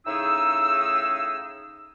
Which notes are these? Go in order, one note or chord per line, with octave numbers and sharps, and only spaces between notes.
A2 C#3 D#4 G#4 E6